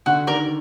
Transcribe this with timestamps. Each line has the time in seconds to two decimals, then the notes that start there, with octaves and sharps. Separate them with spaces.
0.06 D3 F#4
0.27 D#3 A#4 D5